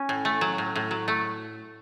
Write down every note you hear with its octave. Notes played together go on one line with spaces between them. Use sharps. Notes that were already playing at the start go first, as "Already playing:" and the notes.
Already playing: C#4
A2
A3
F#3
A2
A2
F#3
A3